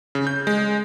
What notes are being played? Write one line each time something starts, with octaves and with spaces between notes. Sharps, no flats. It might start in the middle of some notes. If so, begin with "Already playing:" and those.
C#3
G6
G#3